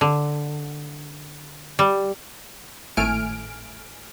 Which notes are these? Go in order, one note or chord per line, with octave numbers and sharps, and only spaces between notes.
D3
G3
G#1 A2 A3 G#5 F6 D7